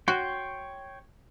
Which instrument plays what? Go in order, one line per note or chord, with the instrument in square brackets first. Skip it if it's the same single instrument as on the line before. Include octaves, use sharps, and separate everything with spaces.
[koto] F#4 [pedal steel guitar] C#5 G5 C6